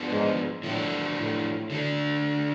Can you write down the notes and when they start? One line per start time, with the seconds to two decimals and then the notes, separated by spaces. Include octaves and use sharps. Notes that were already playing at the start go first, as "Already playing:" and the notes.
Already playing: F3 B3 D4
0.10 G#2
0.63 A2 F3 A3 D4
1.17 A2
1.70 D3 A3 D4